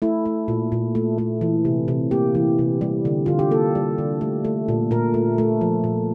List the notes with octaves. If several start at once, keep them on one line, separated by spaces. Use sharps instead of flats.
A3 E4
A3
A#2
A#2
A3
A3
E3
C3
C3
A#3 G4
E3
C3
G3
D3
D3 F4
G4
A#3 A4
G3
D3
A3
A3
A#2
A#2 A#4
A3
A3
F3
A#2